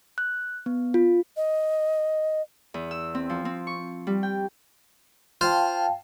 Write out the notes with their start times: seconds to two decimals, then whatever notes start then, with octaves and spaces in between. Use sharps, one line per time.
0.18 F#6
0.66 B3
0.94 F4
1.37 D#5
2.74 E2
2.91 E6
3.15 C4
3.30 F3
3.45 C4
3.67 C#6
4.07 G3
4.23 G5
5.41 F4 C5 F5 G5 A5